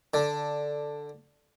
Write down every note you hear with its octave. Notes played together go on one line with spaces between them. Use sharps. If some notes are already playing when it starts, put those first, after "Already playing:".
D3